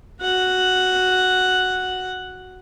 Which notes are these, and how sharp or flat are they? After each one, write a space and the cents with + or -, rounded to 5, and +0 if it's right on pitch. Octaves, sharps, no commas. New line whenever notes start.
F#4 +0 F#5 +0